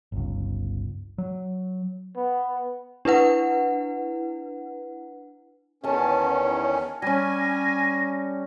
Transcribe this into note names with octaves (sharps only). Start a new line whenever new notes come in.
G1 C#2
F#3
B3
D4 E4 B4 F#5
E2 D#3 C#4 G#5 A5
G3 C#4 G#5 A#6